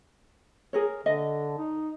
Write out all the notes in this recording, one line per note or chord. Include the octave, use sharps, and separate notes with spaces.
G#4 A#4 C#5
D3 D#5
D#4